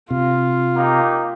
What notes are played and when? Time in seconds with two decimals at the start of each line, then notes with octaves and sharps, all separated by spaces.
0.11 C3 F4
0.76 A#3 D#4 G4